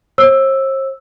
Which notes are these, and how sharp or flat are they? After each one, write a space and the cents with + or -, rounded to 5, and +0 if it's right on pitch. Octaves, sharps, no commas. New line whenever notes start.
C5 +45 E6 +0